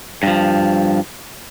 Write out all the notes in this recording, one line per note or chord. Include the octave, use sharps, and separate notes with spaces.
G2 F3